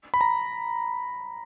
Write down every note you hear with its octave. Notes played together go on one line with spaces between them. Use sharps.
B5
A#5